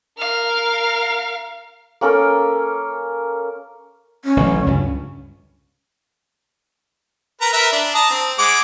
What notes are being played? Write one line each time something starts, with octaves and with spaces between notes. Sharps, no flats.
A#4 F5
A#3 C#4 A4 A#4
C#4
A1 D3 F#3
C#2 G2
A#4 B4 A#5
A#4 B4 E5
D4
A5 A#5 D#6
C4
G#3 F#5 D6